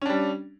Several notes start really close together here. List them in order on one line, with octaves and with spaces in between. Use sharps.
C#4 D4 G3